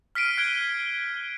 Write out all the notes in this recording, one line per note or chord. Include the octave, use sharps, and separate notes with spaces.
F6 B6 C7 D7 D#7
F6 F#6 G#6 D7 G7